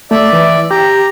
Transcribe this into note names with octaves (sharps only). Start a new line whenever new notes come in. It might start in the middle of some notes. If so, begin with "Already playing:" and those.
A3 D5 E5
E3
G4 A#5